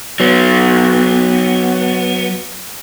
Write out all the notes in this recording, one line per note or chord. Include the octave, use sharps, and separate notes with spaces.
F#3 B3